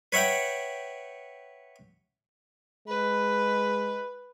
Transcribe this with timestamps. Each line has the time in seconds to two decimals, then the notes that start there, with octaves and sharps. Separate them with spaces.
0.12 B4 C#5 E5 F#5 G5
2.87 G#3 B4